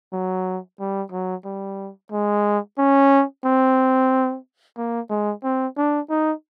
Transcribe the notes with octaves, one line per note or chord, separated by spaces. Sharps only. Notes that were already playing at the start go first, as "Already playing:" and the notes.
F#3
G3
F#3
G3
G#3
C#4
C4
A#3
G#3
C4
D4
D#4